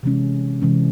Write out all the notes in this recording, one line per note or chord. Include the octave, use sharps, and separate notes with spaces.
C3 E3 G#3 C#4
C3 E3 G#3 C#4